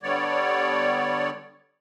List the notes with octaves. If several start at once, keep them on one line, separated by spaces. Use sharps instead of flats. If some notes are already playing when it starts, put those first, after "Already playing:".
D3 G3 B3 C#5 D5